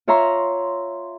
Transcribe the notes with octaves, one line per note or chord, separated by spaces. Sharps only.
F4 C#5 E5 A#5 C6